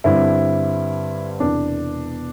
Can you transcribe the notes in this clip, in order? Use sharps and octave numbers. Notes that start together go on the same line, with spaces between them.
G2 D3 G3 C4 E4
E1 E2 C3 E3 D4